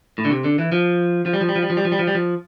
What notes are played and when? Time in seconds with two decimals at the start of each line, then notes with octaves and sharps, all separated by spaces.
0.18 A2
0.25 D3
0.31 C3
0.44 D3
0.59 E3
0.72 F3
1.26 F3
1.33 G3
1.41 F3
1.49 G3
1.56 F3
1.62 G3
1.70 F3
1.77 G3
1.85 F3
1.92 G3
1.99 F3
2.07 G3
2.15 F3